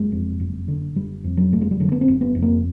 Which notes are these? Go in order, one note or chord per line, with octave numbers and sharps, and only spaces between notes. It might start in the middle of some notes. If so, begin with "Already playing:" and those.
Already playing: F#1 G#3
F2
F#1
D3
F#1 G3
F2
F#3
F#1 A3
G#3
G3
D3 F#3
B3
C4
F#1
B3
F2
A#3